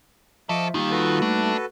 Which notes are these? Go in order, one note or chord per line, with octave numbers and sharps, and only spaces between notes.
F3 A4 D#5 E5 C#6 D6
D#2 D#3 G3 A#3 D#4 F4 G4
F#4 A4 B4
A3 D4